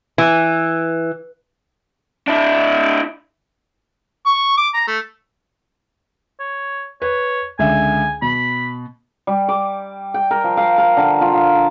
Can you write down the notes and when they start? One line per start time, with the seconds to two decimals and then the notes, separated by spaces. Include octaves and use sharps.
0.18 E3
2.28 D4 E4
4.26 C#6
4.57 D6
4.74 A#5
4.88 A3
6.40 C#5
7.02 B4 C#5
7.59 C#2 D3 E5 G#5
8.22 B2 B5
9.27 G3
9.49 D6
10.14 G5
10.31 A#4
10.44 F3
10.57 F5
10.78 A#4
10.97 D3
11.21 F4
11.33 F4
11.54 A5